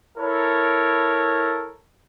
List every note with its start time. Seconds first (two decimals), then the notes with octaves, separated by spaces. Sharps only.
0.18 E4 A4 A#4 C#5